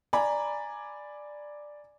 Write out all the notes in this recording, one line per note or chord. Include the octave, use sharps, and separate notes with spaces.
D5 G#5 A#5 B5